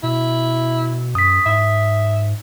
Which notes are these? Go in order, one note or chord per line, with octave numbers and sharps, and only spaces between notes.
B2 E4
F#2 D#6 B6
G#2 E5